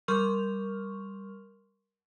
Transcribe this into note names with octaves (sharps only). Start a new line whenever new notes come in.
G3 A#4 C6 C#6 F6 F7